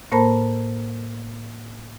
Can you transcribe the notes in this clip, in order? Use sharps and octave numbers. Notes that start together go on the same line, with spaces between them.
A2 A#3 A#4 C5 A5 B5